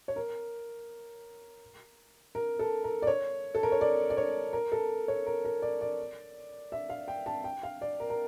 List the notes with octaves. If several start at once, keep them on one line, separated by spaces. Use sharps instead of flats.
C#5
A#4
A#4
A4
A#4
D5
C#5
A4
A#4
C#5
D5
D5
C#5
A#4
A4
C#5
A#4
A#4
D5
D5
E5
F5
G5
A5
G5
F5
D5
A#4
A#4